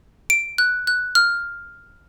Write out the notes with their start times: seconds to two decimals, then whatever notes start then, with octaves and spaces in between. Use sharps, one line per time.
0.30 D7
0.58 F#6
0.87 F#6
1.15 F6